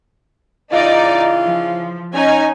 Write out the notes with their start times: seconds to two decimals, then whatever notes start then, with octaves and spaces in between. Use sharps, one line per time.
0.71 C#3 E3 D#4 F4 D5
1.44 F3
2.13 C#4 D#4 G#5